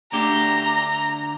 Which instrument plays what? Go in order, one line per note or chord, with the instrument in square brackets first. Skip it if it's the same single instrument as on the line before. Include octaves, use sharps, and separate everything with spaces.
[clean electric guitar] D2 D3 G4 [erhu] A#5